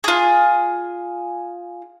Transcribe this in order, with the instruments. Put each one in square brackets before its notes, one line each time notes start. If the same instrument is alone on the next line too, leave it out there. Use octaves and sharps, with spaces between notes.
[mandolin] F4 G#4